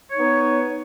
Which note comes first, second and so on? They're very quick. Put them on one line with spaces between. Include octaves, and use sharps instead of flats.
C#5 D#4 B3